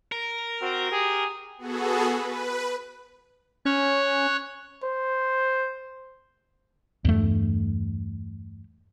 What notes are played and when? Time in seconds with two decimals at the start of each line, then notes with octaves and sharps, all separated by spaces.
0.12 A#4
0.62 C4 F#4
0.92 G4 G#4
1.58 B3 F#4 G#4 A4
2.15 B4
3.65 C#4 C#5 C#6 F#6
4.83 C5
7.05 E2 G2 A3